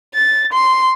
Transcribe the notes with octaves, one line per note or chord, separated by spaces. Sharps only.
A6
C6